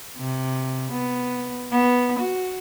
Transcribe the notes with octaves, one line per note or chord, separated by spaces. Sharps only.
C3
B3
B3
F#4